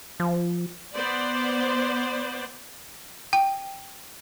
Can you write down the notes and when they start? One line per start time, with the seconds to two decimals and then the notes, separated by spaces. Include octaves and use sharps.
0.20 F3
0.93 B3 C5 D5
3.33 G5